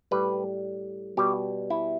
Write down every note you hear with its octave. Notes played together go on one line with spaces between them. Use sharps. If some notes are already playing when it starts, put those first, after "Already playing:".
A2 G3 B4
B2 G3 G4
E4